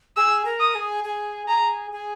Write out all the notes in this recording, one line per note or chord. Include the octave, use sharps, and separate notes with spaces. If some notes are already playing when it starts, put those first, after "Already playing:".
G#4 E6
A#4
D#6
G#4
G#4
G#4 A#5
G#4